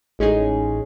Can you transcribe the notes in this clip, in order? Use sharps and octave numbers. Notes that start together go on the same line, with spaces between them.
A1 G#3 C#4 D#4 G#4